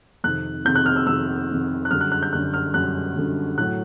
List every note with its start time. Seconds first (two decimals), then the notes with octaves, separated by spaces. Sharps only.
0.24 F2 C3 D#3 F#6
0.65 F2 C3 D#3 G6
0.75 F#6
0.86 F6
0.96 E6
1.07 F2 C3 D#3 E6
1.50 F2 C3 D#3
1.85 F#6
1.90 F#2 D3 G3 F6
2.01 F#6
2.12 F#6
2.23 G6
2.33 F#2 D3 G3 F#6
2.54 F6
2.74 F#2 D3 G3 F#6
3.16 F#2 D3 G3
3.58 A2 F#3 F#6